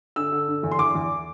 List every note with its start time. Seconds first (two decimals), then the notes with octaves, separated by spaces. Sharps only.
0.16 D3 E6
0.32 D3
0.48 D3
0.63 E2
0.71 C6
0.79 E2 D6
0.95 E2